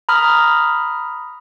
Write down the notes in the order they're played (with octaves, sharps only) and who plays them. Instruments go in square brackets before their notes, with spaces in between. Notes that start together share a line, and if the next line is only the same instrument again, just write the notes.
[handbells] A#5 B5 D#6 F6